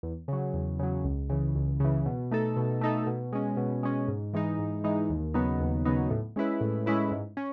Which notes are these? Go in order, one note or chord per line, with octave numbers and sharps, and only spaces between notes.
E2
C#3 F#3
E2
C#3 F#3
C#2
C#3 E3
C#2
C#3 E3
B2
A3 D#4 A4
B2
A3 D#4 A4
B2
G#3 C#4
B2
G#3 C#4
G#2
E3 G#3 D#4
G#2
E3 G#3 D#4
D#2
C#3 F#3 B3 D#4
D#2
C#3 F#3 B3 D#4
A2
G#3 C#4 E4 B4
A2
G#3 C#4 E4 B4
G#2
C#4